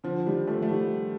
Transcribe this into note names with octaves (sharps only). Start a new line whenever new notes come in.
D3 F3
D#3 G3
F3 A3
A3
D#3 G3